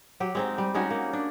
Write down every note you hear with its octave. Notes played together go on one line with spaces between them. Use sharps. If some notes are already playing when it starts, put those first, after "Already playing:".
F#3 G4
G#3 C4 D#4
G3
G#3 C#4 D#4 F#4
A#3
D4